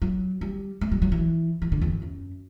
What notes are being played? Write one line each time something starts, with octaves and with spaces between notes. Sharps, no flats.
F#3
G3
A3
G3
F#3
E3
E3
D3
E2
F#2
F#2